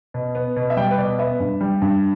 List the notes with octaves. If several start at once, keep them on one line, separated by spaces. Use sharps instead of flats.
B2
B3
B2
E5
G3 G5
B4
B2 D5
B3 E5
G2
G3
G2